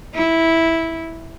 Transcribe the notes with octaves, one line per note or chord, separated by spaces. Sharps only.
E4